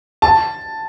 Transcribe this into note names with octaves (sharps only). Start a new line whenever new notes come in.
A5